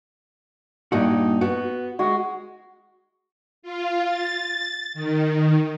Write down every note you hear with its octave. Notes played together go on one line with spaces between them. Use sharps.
G2 A#2 D#4 F#4
B3 F#4
G#3 F#4
F4
A6
D#3